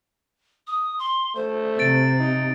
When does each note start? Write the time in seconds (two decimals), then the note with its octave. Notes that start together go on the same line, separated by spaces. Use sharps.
0.67 D#6
0.99 C6
1.36 A3 C5
1.79 C3 A6 D7
2.20 D#4